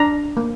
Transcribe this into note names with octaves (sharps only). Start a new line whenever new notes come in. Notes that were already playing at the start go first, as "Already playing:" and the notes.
Already playing: D4 A#5
A#3